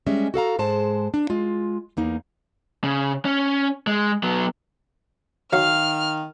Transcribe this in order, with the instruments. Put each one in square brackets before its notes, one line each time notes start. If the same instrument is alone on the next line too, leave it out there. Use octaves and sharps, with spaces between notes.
[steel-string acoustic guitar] G3 G#3 C#4 D#5 E5
F#4 A4 F5 A#5
G#2 G#3 C5 A5
D4
G#3 F4
E2 A#3 D#4
[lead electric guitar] C#3
C#4
G#3
F#3 B3
[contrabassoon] D#3 [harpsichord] F#3 [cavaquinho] F5 [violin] F6